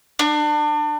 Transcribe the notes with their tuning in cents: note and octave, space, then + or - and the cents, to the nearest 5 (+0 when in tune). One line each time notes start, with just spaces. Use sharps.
D4 +30